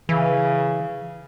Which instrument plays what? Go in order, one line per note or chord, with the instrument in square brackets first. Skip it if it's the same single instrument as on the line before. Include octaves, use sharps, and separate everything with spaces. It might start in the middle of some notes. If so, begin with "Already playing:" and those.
[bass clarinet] C#3 [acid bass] E3